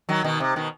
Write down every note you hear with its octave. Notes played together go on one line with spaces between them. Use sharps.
D#3 F#3
B2 D#3
C3
B2 D#3